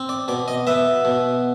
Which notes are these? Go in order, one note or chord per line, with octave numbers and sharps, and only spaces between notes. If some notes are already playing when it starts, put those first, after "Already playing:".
Already playing: C4
D5
B2 D5
D#5
B3 E5
B2